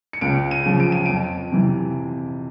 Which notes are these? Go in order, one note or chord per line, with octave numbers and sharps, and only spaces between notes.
C#7
C#2 D7
D#7
C#3 F3
D7
D#7
F2 D7
C3 E3